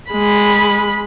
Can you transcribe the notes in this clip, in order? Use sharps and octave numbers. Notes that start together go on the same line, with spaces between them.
G#3 B5